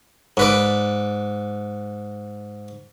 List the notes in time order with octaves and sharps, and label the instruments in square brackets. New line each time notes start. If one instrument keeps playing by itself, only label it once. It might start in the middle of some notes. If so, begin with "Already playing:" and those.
[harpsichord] G#2 B4 D5